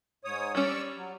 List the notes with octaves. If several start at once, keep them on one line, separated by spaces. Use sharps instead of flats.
G#2 C#5 D#6
G3 C#4 D5 C#6 E6
F#3